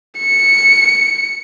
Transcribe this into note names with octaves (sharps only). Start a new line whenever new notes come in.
C#7